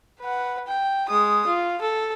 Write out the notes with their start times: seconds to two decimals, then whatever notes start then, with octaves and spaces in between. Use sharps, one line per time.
0.20 B4 F#5
0.68 G5
1.09 G#3 D#6
1.47 F4
1.82 A4